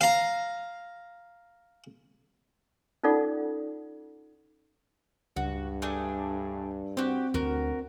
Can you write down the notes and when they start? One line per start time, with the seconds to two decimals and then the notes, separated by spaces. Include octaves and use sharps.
0.01 F5 A#5
3.03 C#4 D#4 F4 A4 D5 F#5
5.36 C#2 G2 F#4
5.82 A3 D4 G#4
6.97 C4 F#4 G4
7.34 D2 F#4 A#4